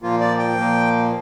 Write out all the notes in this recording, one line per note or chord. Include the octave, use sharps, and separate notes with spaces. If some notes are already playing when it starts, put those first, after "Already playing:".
A#2 F3 A#3 F4
D5
G5
A#2 F3 A#3